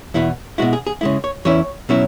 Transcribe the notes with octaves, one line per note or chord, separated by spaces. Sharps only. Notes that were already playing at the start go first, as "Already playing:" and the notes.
E2 B2 B3 E4
B2 G#3 E4 F#4
G#4
G#4
C#3 G#3 E4
C#5
E2 E3 C#4 E4 C#5
B2 F#3 C#4 E4